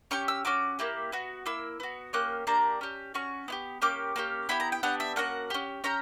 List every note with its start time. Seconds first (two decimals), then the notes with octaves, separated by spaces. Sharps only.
0.11 C#4 G4 C#6
0.28 E6
0.45 C#4 F#4 D6
0.79 A#3 E4 G4
1.12 B3 F#4
1.46 A#3 E4 E6
1.80 B3 F#4
2.13 A#3 C#4 G4 F#6
2.47 A#3 D4 G4 A#5
2.81 C#4 G4
3.14 C#4 F#4 C#6
3.48 B3 E4 G4
3.82 A#3 C#4 G4 D6
4.16 A#3 C#4 G4
4.49 B3 E4 G4 B5
4.60 A#5
4.72 G5
4.83 B3 D4 G4 F#5
5.00 E5
5.16 A#3 C#4 F#4 F#5
5.50 C#4 G4
5.84 C#4 G4 A#5